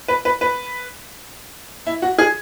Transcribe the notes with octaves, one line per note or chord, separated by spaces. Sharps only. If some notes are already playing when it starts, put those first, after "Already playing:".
B4
B4
B4
E4
F#4
G#4